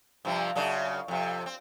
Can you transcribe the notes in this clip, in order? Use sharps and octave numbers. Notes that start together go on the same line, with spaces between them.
G2 C3 F3
F#2 C#3 D4
F2 C3
C4